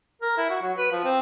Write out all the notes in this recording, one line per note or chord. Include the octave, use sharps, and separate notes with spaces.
A#4
E4
F#4
F#3
B4
F3
C4